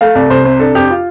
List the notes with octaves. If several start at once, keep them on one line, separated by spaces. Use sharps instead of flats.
A3 F5
C2 D5
C2 C5
C3 C5
D4 A4
F2 G4
F4